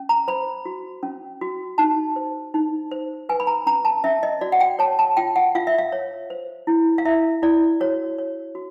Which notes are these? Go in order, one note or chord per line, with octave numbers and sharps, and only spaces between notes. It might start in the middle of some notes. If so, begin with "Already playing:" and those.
Already playing: C#4
A#5
C5 B5
F#4
C#4
F#4
D#4 A5
C5
D#4
C5
B4 G#5
B5
A#5
C#4 A#5
A5
C#4 E5
D#5
F#4 D5
F#5
G5
C#5 A5
A5
F4 G5
F#5
F4 F5
E5
F5
C#5
C5
E4
F5
E4 E5
E4 D5
F#4 C#5
C#5
F#4